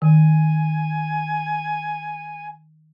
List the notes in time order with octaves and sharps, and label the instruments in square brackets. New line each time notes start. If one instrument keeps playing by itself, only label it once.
[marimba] D#3 [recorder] G#5